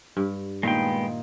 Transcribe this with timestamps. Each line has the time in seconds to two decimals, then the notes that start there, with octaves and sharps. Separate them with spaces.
0.17 G2
0.63 A#2 D#3 G#3 B3 D#4 G5